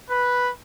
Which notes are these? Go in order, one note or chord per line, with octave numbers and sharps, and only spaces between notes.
B4